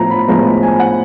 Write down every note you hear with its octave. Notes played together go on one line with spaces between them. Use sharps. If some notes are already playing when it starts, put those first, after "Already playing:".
Already playing: A2 F3 B3 A#5
B5
A2 F3 G#3 B3 A#5
G#5
F#5